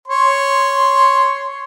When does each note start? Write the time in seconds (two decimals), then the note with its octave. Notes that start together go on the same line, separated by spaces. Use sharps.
0.08 C#5 C6